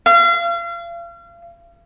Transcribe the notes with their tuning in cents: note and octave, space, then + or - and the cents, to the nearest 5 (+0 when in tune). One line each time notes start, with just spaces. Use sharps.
F5 -35